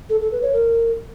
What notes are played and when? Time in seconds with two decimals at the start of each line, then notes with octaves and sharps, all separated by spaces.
0.10 A4
0.21 A4
0.31 B4
0.42 C#5
0.53 A#4